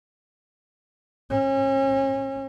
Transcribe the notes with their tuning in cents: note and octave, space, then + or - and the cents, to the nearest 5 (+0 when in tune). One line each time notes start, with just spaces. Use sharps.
C#4 -35